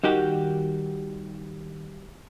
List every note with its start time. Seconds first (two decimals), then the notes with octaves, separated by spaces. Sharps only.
0.04 D#3 G3 F#4 G4